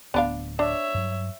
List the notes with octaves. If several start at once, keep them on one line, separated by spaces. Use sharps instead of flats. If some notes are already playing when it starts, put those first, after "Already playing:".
D1 B3 D4 F5
D4 C#5 E5
G2 F#3